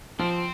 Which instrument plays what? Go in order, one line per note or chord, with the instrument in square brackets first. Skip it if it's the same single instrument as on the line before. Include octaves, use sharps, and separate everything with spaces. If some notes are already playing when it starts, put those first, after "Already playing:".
[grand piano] F3 [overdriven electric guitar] C4